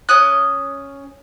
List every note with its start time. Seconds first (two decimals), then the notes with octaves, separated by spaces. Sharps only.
0.09 C#4 D#6 F#6